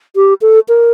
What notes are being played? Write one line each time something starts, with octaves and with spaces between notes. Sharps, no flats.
G4
A4
A#4